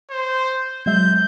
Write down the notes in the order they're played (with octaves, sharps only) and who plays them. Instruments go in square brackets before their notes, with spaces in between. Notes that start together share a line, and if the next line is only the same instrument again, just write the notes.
[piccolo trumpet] C5
[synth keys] F#3 G#3 E5 [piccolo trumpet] G6